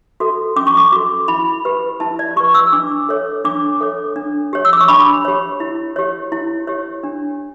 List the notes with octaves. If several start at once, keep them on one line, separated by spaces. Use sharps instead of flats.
F#4 A4
C#4 D6
C#6
D6
F#4 A4 D6
E4 B5
G4 B4
E4 A5
D5
G4 B4 C#6
E6
D4 D6
A4 C#5
D4 D6
A4 C#5
D4
G4 C#5
E6
D6
C#6
D4 B5
G4 C#5
E4
G4 C#5
E4
G4 C#5
D4